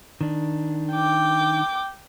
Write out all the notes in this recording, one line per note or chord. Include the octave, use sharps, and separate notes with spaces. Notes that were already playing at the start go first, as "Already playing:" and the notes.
D#3 D4
G5 D6